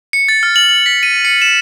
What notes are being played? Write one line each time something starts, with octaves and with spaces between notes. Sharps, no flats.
C#7
A6
F6
F#7
F#7
B6
D#7
C#7
E7